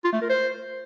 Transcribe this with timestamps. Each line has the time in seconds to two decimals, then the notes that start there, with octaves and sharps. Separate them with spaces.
0.04 F4
0.13 A3
0.21 A#4
0.30 C5